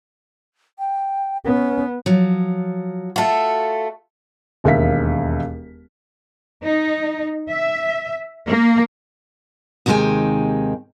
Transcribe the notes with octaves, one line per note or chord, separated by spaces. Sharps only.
G5
B3 C#4
F3 F#3
A3 F4 F#4 A4
E1 D#2 A#4 E5 F5 B6
D#4
E5
A#3
D#2 C3 D#3 G#3 G5 G#5